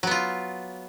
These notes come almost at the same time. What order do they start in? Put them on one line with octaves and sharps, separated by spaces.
F#3 B3 F4